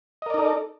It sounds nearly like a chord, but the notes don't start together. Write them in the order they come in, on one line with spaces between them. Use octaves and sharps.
D#5 A#4 D5 D#4 A4